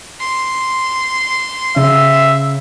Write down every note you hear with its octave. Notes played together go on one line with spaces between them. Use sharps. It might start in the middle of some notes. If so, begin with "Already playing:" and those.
C6
C#3 E5